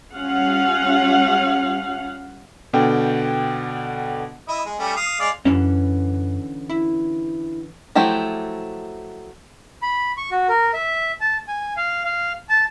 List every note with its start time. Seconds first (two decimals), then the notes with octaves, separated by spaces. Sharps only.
0.15 G3 C#4 F4 F5 F#5
2.73 B2 D3 G5
4.48 E4 D#5
4.66 G#3
4.79 G3 A3 C#4
4.96 F5 D#6
5.20 G#3 D5 F5
5.45 F#2 D3 E3 C#4
6.70 E4
7.95 F3 F#3 A3 E4 G4
9.82 B5
10.17 C#6
10.31 F#4
10.49 A#4
10.74 E5
11.21 A5
11.48 G#5
11.77 F5
12.05 F5
12.49 A5